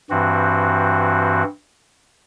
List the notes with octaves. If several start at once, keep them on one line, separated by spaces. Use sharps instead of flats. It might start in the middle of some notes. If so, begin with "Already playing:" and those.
G2 E3 C4 F#4